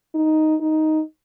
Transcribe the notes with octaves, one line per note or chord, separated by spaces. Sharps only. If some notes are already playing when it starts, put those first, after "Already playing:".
D#4
D#4